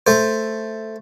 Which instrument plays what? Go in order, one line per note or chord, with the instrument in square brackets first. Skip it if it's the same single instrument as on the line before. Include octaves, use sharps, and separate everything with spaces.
[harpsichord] A3 C5